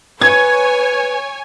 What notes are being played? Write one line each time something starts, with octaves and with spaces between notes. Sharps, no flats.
B4 C#5 G#5 G#6